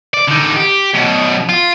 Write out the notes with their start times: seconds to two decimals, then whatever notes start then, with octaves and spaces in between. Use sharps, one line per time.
0.14 D5
0.28 D3 D#4
0.56 G4
0.94 F#2 B2
1.49 F4